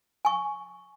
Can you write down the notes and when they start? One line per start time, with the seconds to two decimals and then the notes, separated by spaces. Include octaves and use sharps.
0.25 G#5 C#6